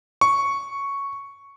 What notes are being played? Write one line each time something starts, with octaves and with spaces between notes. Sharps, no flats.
C#6